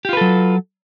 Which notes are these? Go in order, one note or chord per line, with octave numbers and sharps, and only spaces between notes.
F#3 F4 G4 A4 B4